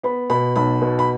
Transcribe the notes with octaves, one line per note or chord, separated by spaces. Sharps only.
B3 B5
B2 B5
B1 B5
B2
B5